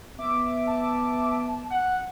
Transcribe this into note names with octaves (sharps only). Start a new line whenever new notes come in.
B3 E5 D6
A5
F#5